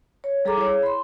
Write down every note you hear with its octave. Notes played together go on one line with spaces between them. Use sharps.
C#5
G3 G#4 A4 A#5 D6
E4 G#4 C#5
B5 C6